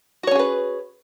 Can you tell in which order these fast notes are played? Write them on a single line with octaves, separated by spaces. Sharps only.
F#4 C#5 C#4 G#4 B4